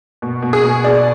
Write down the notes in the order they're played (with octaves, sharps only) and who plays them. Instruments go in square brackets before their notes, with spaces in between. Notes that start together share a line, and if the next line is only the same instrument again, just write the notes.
[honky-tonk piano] B2
B2
G#4
B2
B2 D5